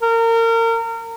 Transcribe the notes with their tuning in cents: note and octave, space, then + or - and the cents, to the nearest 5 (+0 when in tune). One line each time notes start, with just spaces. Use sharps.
A#4 -30